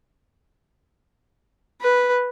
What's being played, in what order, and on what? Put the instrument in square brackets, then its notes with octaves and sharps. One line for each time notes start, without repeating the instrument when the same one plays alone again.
[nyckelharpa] B4